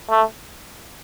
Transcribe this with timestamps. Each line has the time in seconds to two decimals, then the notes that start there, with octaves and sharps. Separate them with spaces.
0.10 A3